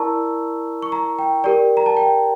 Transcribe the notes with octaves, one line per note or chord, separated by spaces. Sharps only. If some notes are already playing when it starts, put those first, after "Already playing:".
Already playing: E4 A#4 D5 A5 A#5 C#6 E6
C#6
A#5
G5
G4 A#4 D5
A#5
A5
G5